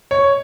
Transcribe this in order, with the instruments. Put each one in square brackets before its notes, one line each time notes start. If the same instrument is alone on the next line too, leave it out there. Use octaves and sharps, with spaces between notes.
[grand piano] C#5